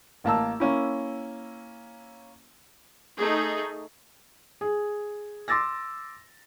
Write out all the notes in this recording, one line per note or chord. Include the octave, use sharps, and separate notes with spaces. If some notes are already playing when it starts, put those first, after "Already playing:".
A1 A#3 A5 E6
A#3 C#4 E4
A3 D#4 G#4
G#4
C6 D6 E6 A6 A#6